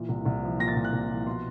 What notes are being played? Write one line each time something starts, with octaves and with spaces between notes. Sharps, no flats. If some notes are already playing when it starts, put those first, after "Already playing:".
Already playing: A#2 E3
C2
C2
F3
A#2 A#6
A6
C2
F#6
C2
F3
B2 C6